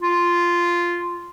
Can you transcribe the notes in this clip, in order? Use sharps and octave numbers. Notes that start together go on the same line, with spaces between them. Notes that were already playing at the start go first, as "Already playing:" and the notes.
F4